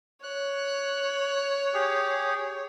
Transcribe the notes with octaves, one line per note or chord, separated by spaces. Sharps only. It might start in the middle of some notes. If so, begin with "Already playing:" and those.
C#5 F#6
G4 G#4